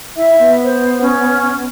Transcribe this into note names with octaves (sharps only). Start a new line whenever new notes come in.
E4 E5
B3
C5
C#4